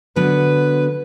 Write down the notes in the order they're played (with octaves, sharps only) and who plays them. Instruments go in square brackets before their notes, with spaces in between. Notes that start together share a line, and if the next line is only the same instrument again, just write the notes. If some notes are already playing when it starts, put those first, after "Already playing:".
[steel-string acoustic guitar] D3 F#3 B3 [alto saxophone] B4